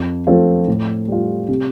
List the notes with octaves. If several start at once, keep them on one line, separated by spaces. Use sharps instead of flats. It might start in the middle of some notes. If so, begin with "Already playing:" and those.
Already playing: F2
F3 A3 C4 F4
A2
G3 F4
C3